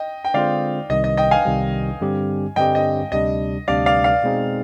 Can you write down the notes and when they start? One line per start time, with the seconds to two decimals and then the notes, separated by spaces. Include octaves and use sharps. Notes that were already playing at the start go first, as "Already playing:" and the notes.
Already playing: D#5 G5
0.25 G5
0.34 D3 G#3 C4 F4 C5 D5 F5
0.90 C2 C3 D#3 G3 D#5
1.04 D#5
1.17 D#5 G5
1.31 F5 G#5
1.45 C2 C3 D#3 G3
2.01 G2 D3 G3 C4 G4
2.56 G2 D3 G3 C4 G4 D#5 G5
2.75 D#5
3.12 D2 C3 G3 D4 D#5
3.68 D2 C3 G3 D4 D5 F5
3.86 D5 F5
4.04 D5 F5
4.23 B2 G#3 C4 D#4 G#4